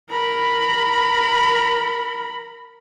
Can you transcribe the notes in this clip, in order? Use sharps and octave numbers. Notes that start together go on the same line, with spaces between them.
A#4 B5